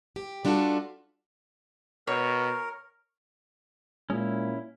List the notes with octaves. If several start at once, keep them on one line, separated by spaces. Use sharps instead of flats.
G4
G3 D4 F4 F#4 A4
B2 A#4 C#5
A#2 G#3 C#4 E4